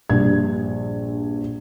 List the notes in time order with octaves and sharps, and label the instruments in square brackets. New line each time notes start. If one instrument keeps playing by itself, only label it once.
[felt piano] A#1 G2 G#6